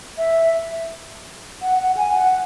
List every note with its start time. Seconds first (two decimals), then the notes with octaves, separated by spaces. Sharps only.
0.18 E5
1.62 F#5
1.79 F#5
1.97 G#5
2.15 F#5